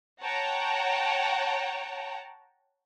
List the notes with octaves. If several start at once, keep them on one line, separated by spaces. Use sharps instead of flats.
C#5 F#5 G5 A5 A#5